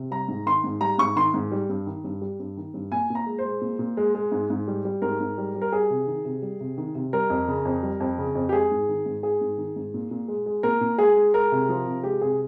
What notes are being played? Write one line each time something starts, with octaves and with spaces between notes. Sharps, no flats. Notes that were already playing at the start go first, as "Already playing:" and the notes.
Already playing: C3
G3 A#5
G#2
D#3 C6
G#2
G3 A#5
G#2 C#6
D#3 C6
G#2
G3
G2
D#3
G2
G3
G2
D#3
G2
A#2 G#5
A#2
A#5
G#3
C5
G#3
A#2
A#2
G#3
G#3
G#2
G#2
G3
G3
G#2 A#4
G#2
G3
G3
A#4
G3 G#4
C3
D#3
C3
G3
C3
D#3
C3
G3 A#4
F2
C#3
F2
G3
F2
C#3
F2
G4
G#3 G#4
G#2
D#3
G#2
G#3 G#4
G#2
D#3
G#2
A#2
A#2
G#3
G#3
A#2 A#4
A#2
G#3 G#4
G#3
G#3 A#4
C3
F3
C3
G#3 G4
C3 G#4